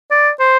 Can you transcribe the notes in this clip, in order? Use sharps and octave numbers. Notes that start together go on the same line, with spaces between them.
D5
C5